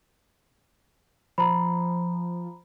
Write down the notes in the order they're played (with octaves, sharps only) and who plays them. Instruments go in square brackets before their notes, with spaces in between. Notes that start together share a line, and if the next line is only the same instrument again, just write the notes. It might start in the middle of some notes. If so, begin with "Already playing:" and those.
[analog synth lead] F3 [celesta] A#5 B5